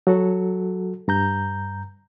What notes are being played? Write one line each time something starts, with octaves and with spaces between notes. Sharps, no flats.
F#3 F#4 A4
G2 A#5 G6